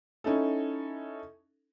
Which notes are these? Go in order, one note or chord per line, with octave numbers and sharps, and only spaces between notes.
C#4 D#4 E4 A4